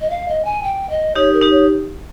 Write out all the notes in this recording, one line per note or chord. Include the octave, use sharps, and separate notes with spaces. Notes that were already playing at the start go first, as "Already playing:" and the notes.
D#5
F5
D#5
G#5
G5
D#5
D#4 G4 C#5
A#4
D#4 G4
C#5